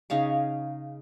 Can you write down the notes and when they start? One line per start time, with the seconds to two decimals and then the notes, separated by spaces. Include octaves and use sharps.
0.10 C#3 D#4 F5 C#6